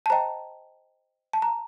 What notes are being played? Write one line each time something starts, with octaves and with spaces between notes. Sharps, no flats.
A5
C5 D#5 G5 A#5
A5
A#5